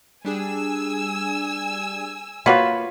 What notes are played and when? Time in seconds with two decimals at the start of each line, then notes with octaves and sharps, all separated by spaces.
0.25 G3 D4 G#4 G#5 E6
2.46 A#3 F4 F#4 B4 C#5 F5